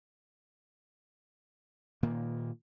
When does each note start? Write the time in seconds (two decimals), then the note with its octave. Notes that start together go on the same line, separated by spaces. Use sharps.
2.03 A#2 D#3 A#3